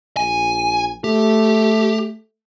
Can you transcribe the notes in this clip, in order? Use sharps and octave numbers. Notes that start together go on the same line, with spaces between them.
A#1 G#5
A3 G4